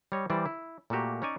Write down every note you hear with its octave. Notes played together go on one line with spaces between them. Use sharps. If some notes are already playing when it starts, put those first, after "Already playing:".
G3 C#5 D#5
E3 G3 C5 D5
E4
A#2 A3 A#3 F#4 G4
C#4 D#4 C#5 D5 G#5